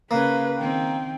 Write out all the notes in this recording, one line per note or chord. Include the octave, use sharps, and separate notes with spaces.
C#3 A#3 B4
D#3 C4 G5